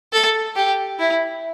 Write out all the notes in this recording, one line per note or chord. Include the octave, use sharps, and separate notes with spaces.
A4
G4
E4